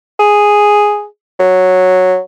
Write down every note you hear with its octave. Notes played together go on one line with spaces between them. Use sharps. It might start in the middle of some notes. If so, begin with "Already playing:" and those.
G#4
F#3